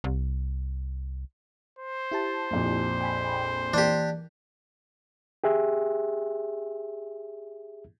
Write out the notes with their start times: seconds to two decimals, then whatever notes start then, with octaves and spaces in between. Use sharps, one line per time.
0.04 C2
1.79 C5
2.11 E4 G4 A5
2.51 A#1 F2 A#2
3.01 G5 G#5 B5
3.74 E3 A#3 D4 G4
5.44 G4 G#4 E5